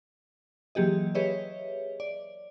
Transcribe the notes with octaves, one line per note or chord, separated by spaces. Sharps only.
E3 F#3 A#3 G4 G#4 D#5
G4 G#4 B4 C#5 D#5 E5
D5